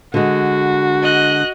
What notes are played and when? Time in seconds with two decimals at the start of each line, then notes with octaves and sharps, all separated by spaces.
0.14 D3 G#3 F#4
1.03 D#5 F#6